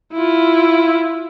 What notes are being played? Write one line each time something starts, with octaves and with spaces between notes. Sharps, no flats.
E4 F4